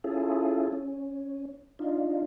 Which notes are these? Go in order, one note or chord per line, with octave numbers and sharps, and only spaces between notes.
C#4 E4 F4 G#4 A4
C#4
D4 D#4 F4